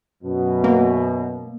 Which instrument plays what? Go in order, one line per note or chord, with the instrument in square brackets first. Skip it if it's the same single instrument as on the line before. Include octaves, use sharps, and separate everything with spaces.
[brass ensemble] F#2 B2
[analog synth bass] A#3